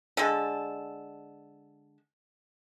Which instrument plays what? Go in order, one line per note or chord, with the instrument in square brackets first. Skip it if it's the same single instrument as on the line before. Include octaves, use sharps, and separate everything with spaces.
[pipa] D3 G#3 A4